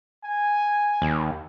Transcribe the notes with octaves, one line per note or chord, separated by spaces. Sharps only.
G#5
D#2